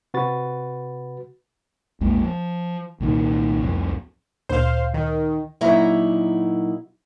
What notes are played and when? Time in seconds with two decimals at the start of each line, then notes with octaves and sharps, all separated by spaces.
0.14 C3 F#4 B4 A6
2.01 A#1 E2 G#3 A#3
2.22 F3
3.00 C2 A#2 D#3
3.61 C2 F2 A2 C3
4.49 D2 A#2 C5 F5
4.94 D#3
5.61 A#2 F#3 D#4 E4 A#5